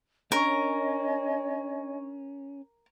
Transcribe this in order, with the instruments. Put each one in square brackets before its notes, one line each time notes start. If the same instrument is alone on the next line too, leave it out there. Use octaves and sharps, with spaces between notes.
[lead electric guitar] C#4 [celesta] D4 C#6 [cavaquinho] A#4 [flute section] C#5 D#5 G#5